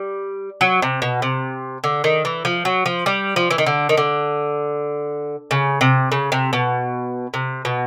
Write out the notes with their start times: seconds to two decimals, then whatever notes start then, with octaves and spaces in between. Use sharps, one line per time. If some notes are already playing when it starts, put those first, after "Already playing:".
Already playing: G3
0.61 F#3
0.82 C3
1.02 B2
1.22 C3
1.84 D3
2.04 D#3
2.25 E3
2.45 F3
2.65 F#3
2.86 F3
3.06 G3
3.36 F3
3.51 E3
3.58 D#3
3.66 D3
3.89 D#3
3.97 D3
5.51 C#3
5.81 C3
6.12 C#3
6.32 C3
6.53 B2
7.34 C3
7.65 B2